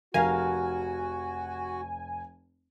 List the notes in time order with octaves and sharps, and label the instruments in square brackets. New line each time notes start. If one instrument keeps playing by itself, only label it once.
[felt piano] F1 [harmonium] F#4 [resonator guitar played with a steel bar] A#4 F5 [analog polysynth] G#5